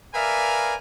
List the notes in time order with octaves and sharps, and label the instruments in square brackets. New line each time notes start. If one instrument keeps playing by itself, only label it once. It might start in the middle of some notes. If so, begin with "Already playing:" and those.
[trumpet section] A#4 B4 D5 E5 F5 G#5